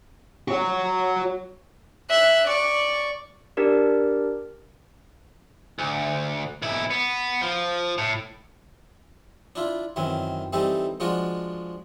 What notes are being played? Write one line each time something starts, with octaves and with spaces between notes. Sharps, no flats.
F#4 C#5
E5 F#6
D5 C#6
D4 G4 A#4 D5
D2
B1 E4
B3
F3
A2
D4 E4 F4
F#2 D#3 E3 C4
E3 G3 C4 D#4 A4
F3 G#3 D4 F4 F#4